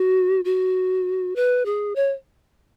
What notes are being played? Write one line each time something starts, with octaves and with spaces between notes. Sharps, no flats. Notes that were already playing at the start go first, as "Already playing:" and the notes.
Already playing: F#4
F#4
B4
G#4
C#5